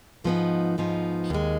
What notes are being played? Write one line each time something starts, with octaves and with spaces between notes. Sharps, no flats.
G#2 F3 B3 D#4
G#2 F3 B3 D#4
D#2 D#3 G#3